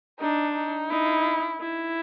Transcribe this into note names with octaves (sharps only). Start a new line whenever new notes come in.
D4 D#4
D#4
D#4 E4
E4